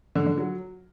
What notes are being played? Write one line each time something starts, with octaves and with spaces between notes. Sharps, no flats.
D3
D3
F#3